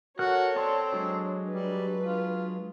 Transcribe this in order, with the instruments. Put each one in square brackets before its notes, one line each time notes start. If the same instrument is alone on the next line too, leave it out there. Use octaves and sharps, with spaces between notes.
[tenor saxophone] F#4 [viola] A4 C#5 [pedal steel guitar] A#4 F#5 F#6
[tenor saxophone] C4 [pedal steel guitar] D5 A5 C6
[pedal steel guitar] F#3 G#3 D4
[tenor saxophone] G3 [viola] B4
[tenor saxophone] F4